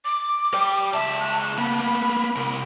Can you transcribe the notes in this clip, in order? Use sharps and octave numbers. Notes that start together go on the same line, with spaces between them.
D6
D5 G5
C#2 E5 A5
F#6
A#3 B3 B5
C3 A#4